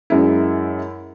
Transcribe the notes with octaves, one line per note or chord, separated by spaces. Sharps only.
F#2 G#3 E4